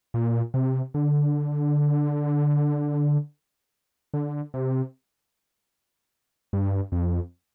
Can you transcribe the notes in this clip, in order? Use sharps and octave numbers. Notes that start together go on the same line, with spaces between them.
A#2
C3
D3
D3
C3
G2
F2